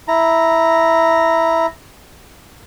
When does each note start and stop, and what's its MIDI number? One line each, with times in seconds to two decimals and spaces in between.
0.08 1.66 64
0.08 1.66 82